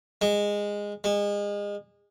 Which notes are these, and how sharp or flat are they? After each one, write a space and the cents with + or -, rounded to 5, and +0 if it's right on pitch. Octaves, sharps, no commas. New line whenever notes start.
G#3 -15
G#3 -30